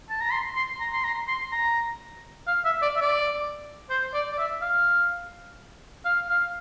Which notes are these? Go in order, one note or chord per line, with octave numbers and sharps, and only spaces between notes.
A5
A#5
C6
C6
A#5
C6
A#5
C6
A#5
F5
E5
D5
E5
D5
C5
D5
D5
E5
F5
F5
F5